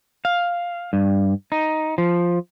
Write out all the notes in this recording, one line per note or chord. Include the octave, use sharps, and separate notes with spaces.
F5
G2
D#4
F3